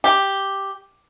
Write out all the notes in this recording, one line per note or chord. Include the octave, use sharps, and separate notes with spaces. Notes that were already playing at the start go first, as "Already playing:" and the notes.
G4